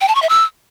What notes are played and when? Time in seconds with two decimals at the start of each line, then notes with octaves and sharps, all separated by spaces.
0.01 G5
0.08 A5
0.15 C#6
0.22 E5
0.29 E6